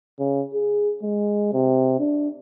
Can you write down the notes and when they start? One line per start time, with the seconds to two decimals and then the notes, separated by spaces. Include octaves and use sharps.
0.19 C#3
0.54 G#4
1.03 G#3
1.53 C3
1.99 D4